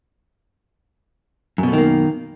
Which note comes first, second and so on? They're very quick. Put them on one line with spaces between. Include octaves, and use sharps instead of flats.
F#2 B2 A3 D#3 A#3